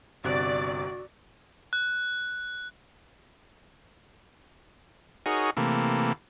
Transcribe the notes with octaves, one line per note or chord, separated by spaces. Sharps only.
G1 C3 F#4 D5 F#6
F#6
D#4 F#4 G#4 A#4 C#5
C3 E3 A3 A#3